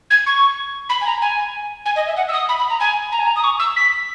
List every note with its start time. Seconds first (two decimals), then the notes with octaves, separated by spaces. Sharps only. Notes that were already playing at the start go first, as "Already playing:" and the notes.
0.10 G#6
0.26 C#6
0.89 B5
1.01 G#5
1.06 A#5
1.22 G#5
1.86 G#5
1.96 D#5
2.07 E5
2.17 F#5
2.28 E6
2.33 D#6
2.49 B5
2.59 B5
2.70 A#5
2.80 G#5
3.12 A#5
3.19 G#5
3.27 A#5
3.36 D#6
3.44 C#6
3.59 E6
3.76 B6